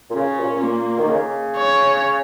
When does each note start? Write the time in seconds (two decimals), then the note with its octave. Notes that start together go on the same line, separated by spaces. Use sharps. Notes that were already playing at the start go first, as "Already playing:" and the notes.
0.10 A#2
0.15 C#3 C#4
0.39 A#2
0.56 A#2
0.63 A#3
0.99 D#3
1.10 C#3
1.57 C#5